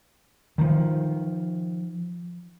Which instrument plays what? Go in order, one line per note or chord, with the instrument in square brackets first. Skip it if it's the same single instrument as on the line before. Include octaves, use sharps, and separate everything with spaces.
[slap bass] D#3 F3